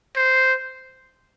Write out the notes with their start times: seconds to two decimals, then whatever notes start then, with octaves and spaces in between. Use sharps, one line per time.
0.16 C5